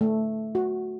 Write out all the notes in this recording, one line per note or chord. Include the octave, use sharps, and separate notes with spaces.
A3
F#4